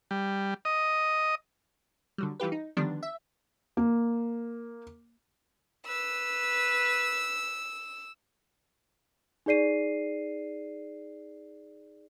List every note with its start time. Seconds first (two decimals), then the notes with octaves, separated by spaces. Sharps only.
0.11 G3
0.65 D#5
2.18 D3 F#3 G3
2.40 E3 G3 F4 G4 B4
2.52 D#4
2.77 D3 D#3 F3 G3 B3 D4
3.03 E5
3.77 A#3
5.87 B4 E6
9.46 D#4 G#4 D5 C7 D#7